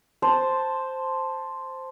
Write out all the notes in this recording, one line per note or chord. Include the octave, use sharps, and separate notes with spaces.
C5 A5